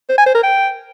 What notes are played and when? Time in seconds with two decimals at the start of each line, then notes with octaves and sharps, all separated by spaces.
0.09 C5
0.18 G#5
0.26 C5
0.35 A#4
0.43 G5